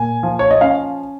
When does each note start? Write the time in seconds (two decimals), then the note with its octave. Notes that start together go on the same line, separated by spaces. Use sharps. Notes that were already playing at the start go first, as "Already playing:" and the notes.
Already playing: A#2 G#5
0.23 F3
0.39 C#5
0.51 D#5
0.61 C#4 F5